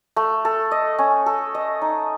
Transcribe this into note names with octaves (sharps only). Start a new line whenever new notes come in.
A3
A4
D#5
C#4
A4
D#5
D#4